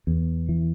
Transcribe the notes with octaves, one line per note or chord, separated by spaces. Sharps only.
E2
E3